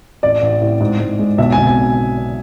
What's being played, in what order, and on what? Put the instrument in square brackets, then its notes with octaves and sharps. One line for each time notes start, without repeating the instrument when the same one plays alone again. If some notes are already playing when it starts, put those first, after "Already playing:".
[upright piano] A1 D5
A1
A2
G#2
G#2
G#3
B1 E5
B1 G#5
G#5